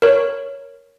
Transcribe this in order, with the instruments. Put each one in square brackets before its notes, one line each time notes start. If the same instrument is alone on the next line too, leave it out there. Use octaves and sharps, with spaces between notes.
[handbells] A#4 C#5